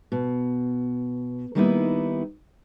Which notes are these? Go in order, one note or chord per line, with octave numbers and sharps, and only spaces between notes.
B2
D#3 G3 A#3 B3 D#4 E4